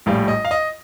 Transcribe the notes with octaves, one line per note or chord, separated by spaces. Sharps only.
A#1 A2 G3 F5
D#5
F5
D#5